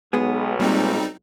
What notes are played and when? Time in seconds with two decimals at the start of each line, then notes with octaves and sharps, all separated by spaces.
0.13 B1 G#3 B3 G#4
0.60 A#2 G3 G#3 C4 D#4